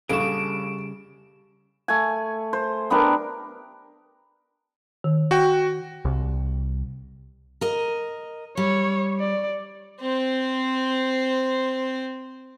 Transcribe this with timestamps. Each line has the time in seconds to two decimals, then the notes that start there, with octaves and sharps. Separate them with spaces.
0.09 A#1 C#3 G3 G#4 A4 C#6 D7 E7
1.88 A3 G#5
2.53 C5
2.90 B3 D4 G4 A#4
5.04 D#3
5.31 F#4 G5
6.05 C2
7.61 A#4 D#5
8.57 G3 C#5
9.19 D5
10.00 C4 C5